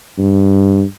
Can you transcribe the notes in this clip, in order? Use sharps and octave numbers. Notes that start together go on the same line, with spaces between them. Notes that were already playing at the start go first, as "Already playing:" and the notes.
G2